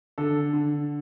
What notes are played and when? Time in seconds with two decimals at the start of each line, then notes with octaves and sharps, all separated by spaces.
0.18 D3 A4
0.53 D3